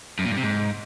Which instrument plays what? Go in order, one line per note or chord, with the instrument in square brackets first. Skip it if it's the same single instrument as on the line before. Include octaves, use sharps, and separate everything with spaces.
[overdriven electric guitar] F#2
A#2
G2
C3
G#2